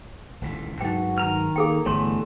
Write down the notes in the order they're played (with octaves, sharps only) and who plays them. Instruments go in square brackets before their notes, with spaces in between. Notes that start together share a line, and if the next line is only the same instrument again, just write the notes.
[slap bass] D#1 C#2 E3
[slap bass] G2 F#3 G#3 [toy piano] D#4 G5 [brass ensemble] F#4 B4
[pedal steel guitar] D#3 A#5 F6
[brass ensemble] A#3 [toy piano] G#4 A4 G5
[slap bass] G1 [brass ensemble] D3 G3 [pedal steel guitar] E3 A3 B3 [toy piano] C#5 C6